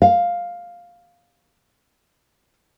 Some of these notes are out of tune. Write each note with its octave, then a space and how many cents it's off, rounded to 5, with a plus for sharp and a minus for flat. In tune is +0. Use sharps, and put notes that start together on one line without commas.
F5 +5